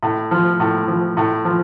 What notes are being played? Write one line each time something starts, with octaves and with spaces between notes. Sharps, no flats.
A2
F3
A2
F3
A2
F3